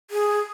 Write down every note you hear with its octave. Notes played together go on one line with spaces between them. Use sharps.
G#4